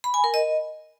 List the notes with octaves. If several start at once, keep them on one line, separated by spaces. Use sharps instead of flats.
B5
G#5
A#4
D#5